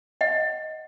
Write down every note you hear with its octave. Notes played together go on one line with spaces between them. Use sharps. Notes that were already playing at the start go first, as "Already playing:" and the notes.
D#5 F#5